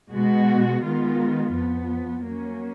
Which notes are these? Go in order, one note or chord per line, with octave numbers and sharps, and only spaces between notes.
B2 G#3 B3 F#4
D#3 G#3 B3 F4
F2 F3 B3
F#3 A#3 C#4